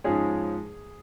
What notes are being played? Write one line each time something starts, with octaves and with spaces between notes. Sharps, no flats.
G#2 F3 G#3 C#4 G#4